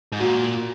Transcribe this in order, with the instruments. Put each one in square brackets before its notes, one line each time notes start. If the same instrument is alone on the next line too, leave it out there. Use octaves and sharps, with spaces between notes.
[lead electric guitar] G#2
[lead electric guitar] A#2 [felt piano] F#4